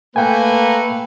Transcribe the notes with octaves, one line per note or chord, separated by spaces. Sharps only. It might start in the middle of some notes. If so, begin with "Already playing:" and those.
A3 A#3 B4 G5 G#5